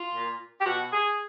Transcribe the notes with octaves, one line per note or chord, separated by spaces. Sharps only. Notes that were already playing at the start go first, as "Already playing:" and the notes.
Already playing: F4
A#2
G4
B2 F#4
G#4